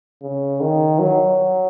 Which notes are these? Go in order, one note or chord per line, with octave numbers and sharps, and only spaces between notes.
C#3
D#3
F#3